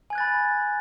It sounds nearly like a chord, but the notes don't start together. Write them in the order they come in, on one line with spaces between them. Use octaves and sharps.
G#5 G#6 F#6 A6 B5